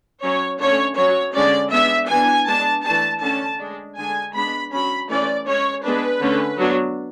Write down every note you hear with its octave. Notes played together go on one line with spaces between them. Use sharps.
F#3 C#4 C#5
D3 A3 C#4 C#5
F#3 C#4 C#5
D3 G#3 C#4 D5
G#3 B3 D4 E5
E3 B3 D4 G#5
G#3 B3 D4 A5
E3 A3 D4 A5
D3 A3 C#4 A5
G#3 D4
D3 G#3 D4 G#5
G#3 B3 D4 B5
F#3 C#4 B5
E3 A3 C#4 D5
G#3 C#4 C#5
G#3 B3 D4 B4
D3 A3 C#4
F#3 B3 D4